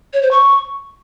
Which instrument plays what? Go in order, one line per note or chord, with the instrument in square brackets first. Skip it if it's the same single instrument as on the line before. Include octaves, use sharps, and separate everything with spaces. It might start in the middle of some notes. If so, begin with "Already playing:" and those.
[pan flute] C#5
C5
C#6